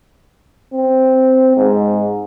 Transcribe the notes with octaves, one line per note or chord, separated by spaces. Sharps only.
C4
G#2